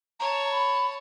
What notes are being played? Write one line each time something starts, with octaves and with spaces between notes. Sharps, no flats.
C#5 A5 A#5
B5